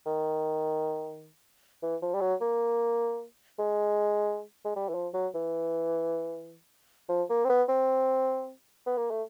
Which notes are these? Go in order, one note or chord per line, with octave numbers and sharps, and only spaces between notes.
D#3
E3
F3
G3
F#3
A#3
G#3
G#3
G3
E3
F3
F#3
E3
F3
A#3
C4
B3
C4
B3
A#3
A3